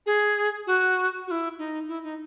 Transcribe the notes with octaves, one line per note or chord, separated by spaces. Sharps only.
G#4
F#4
F#4
E4
D#4
E4
D#4